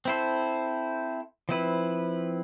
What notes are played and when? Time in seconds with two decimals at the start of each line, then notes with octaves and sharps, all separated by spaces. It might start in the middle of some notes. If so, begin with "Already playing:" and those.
0.05 C4 E4 A4 C5
1.49 F3 C4 E4 B4